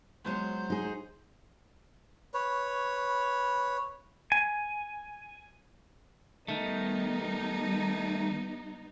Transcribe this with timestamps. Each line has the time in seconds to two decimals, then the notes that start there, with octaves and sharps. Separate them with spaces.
0.25 F#3 G#3 B3 C5
0.70 D#4 G#4
2.34 B4 C#5
4.32 G#5
6.48 D#3 G3 A3 B3 D#4